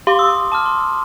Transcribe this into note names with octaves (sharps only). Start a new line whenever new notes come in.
G4 F5 C6 D6
D#6 E6
A5 D6 F6
C6